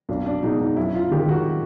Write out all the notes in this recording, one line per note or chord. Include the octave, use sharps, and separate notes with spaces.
B1 D4
D4
B2 G#3 D#4
D#4
F#2 E4
F4
D#3 G#3 G4
F#4